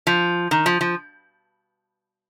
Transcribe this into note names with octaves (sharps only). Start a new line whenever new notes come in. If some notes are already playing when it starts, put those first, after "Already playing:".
F3
D#3
F3
F3